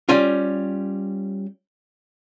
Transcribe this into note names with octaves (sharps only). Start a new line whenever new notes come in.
G3 C#4 F4